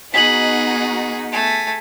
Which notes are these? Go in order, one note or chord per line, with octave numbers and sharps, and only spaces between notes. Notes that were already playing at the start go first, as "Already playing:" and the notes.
B3 D#4 F#4 G#4 B6 F#7
A3 G#5